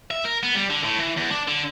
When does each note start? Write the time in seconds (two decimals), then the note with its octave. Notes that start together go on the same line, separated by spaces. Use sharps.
0.11 E5
0.25 A#4
0.43 B3
0.55 G3
0.70 D3
0.83 A2
1.00 E3
1.17 E2
1.31 D4
1.48 D3